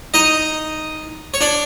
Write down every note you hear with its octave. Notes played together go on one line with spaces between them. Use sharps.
D#4 D#5
C#5
D4 D5